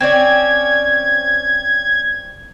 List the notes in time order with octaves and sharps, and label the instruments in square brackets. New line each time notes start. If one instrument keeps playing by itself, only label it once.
[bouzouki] C4 C#4 D5 [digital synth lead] G#6